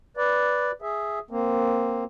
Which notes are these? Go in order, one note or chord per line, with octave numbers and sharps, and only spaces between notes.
B4 D5
G#4 E5
A#3 C4